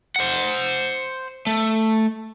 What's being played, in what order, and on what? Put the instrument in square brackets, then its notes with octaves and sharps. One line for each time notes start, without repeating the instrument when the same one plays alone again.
[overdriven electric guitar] C5 F#5
A3